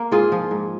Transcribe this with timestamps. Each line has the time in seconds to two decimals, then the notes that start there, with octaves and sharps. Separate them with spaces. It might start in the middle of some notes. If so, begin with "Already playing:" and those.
Already playing: A#3
0.11 G#2 F4 G#4
0.32 F3
0.51 G#2